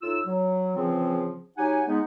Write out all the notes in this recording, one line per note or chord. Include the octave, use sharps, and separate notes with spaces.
A2 D#4 F4 E6
F#3
C#3 E3 F3 C4 F4 G#4
F#3 D#4 G4 F#5 G#5
G#3 B3 D#4